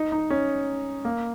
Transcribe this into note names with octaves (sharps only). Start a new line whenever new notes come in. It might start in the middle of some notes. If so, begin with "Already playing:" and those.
Already playing: D#4
D#4
C#4
A#3